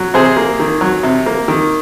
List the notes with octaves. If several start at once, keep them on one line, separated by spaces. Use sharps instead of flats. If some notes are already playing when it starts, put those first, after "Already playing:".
Already playing: F#3
C3 G#4 C5
A#3
D#3
F#3
C3
A#3
D#3